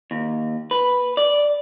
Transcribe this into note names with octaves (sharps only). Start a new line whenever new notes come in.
D#2
B4
D5